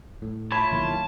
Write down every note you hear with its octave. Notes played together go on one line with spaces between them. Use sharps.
A2
E4 F4 C#5 A5 B5
B1 D#3 A#3